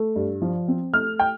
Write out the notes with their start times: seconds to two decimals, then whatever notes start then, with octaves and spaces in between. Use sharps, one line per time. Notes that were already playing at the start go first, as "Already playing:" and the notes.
Already playing: A3
0.16 G2
0.42 F3
0.68 C4
0.93 A3 F6
1.20 G5